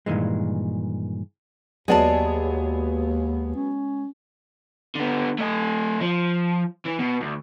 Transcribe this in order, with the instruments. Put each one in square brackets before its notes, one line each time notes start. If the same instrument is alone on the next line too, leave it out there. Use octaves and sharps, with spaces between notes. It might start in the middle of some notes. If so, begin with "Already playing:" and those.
[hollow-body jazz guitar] G2 A#2 D#3 E3 G#3
[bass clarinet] D#2 [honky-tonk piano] F#3 B3 G#4 [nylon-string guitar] G#3 D5 A5
[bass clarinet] C#4
[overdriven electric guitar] D3 B3
A3 D#5
F3
E3
B2
D2